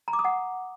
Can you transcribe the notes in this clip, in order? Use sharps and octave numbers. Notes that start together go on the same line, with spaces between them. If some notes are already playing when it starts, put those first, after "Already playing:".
A#5
D6
D#6
F#5